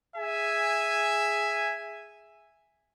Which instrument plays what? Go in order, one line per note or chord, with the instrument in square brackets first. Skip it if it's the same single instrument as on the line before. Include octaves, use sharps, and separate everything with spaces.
[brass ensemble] G#4 E5 G#5